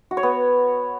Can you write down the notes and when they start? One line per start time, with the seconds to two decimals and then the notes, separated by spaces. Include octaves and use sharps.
0.11 F#4
0.17 C#5
0.23 B3